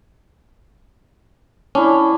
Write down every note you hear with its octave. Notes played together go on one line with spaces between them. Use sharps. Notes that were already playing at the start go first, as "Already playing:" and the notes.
C#4 D4 E4